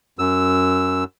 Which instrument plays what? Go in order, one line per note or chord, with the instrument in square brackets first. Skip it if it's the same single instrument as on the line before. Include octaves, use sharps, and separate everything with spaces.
[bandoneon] F#2 E6